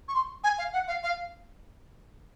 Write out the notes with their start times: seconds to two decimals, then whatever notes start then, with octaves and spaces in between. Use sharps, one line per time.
0.08 C#6
0.14 C6
0.44 G#5
0.58 F5
0.73 F#5
0.88 F5
1.03 F5